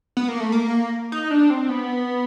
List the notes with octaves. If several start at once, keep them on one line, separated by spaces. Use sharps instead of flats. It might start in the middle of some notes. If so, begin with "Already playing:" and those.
B3
A#3
A3
A#3
D#4
D4
C4
B3